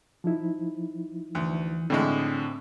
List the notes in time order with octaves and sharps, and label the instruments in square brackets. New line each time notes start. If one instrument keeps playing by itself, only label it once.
[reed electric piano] F3 D#4 E4
[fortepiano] D2 [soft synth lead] E3
[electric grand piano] A2 D3 [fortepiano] G3 G#3 [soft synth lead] C4